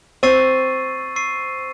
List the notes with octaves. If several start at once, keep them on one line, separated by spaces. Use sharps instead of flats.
C4 C#6 E6 A6 C7 D#7
C#6 E6 A6 C7 D#7